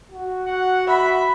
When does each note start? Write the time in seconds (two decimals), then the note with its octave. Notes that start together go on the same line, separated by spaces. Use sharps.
0.12 F#4
0.47 F#5
0.88 E5 B5